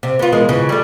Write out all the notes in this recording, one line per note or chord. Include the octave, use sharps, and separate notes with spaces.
C3
B3 F4
E2 G#3 A#4
C#3 E3
G3 A3